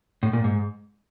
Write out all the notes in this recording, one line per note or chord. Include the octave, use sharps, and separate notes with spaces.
A2
A#2
G#2